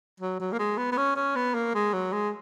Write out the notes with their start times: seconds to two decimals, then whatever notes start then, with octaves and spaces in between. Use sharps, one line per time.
0.20 F#3
0.40 F#3
0.52 A#3
0.59 G#3
0.78 B3
0.92 B3
0.97 C#4
1.16 C#4
1.36 B3
1.54 A#3
1.74 G#3
1.93 F#3
2.12 G#3